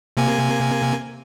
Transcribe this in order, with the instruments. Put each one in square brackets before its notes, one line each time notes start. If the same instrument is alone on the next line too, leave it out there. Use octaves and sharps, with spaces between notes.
[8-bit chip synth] C3 A#3 G#5